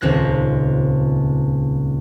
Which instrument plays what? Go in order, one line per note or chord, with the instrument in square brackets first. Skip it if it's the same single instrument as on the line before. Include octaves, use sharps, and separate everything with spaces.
[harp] D#1 C#2 C4 F#6 A#6